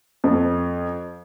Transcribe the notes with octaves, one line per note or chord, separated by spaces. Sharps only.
F2